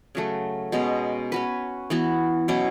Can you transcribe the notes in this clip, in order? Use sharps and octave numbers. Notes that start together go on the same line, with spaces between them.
C#3 F#3 A3
B2 G#3 C#4
C#4 F#4 B4
E3 B3 F#4
B2 F#3 C#4 E4